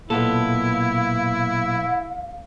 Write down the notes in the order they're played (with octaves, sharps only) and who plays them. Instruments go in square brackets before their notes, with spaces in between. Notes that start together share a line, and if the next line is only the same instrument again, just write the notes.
[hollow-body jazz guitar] B1 B3 A4 [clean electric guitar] A#2 [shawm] E4 [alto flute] F5